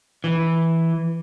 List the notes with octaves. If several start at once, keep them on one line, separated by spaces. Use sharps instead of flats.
E3